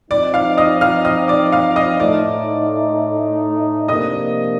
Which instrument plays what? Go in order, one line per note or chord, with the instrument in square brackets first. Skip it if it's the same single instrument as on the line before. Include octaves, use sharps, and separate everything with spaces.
[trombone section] F3 C4 D#4 [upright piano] D5 D6
[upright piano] F5 F6
D#5 D#6
F5 F6
D#5 D#6
D5 D6
F5 F6
D#5 D#6
[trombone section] A2 A3 D#4 [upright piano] D5 D6
[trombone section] C3 F3 A#3 D4 [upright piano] D#5 D#6